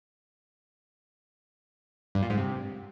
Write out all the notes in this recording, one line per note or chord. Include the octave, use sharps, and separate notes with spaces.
G2
A#2
G#2
C3